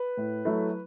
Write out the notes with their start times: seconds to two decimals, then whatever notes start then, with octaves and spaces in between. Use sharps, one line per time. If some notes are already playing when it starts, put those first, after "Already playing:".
Already playing: B4
0.17 A2
0.45 F#3 A3 E4